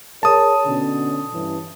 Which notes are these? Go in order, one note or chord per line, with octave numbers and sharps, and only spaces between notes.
G#4 A#4 C#5 A5 D#6
B2 D3 C#4
G2 E3 C#4